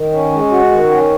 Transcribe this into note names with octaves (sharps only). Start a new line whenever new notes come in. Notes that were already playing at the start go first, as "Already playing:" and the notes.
Already playing: D#3
C#4
G#3
F#4
D#3
C#4